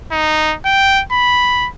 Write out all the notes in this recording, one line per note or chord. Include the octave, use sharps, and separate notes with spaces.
D#4
G5
B5